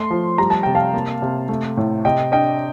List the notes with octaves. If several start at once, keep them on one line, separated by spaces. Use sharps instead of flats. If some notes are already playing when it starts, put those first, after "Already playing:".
Already playing: A3 C6
F3
G3 A#5
A5
C3 G5
F5 A5
A#3
C3
A3
A2
C3 D#5 G5
D4 D#5 G5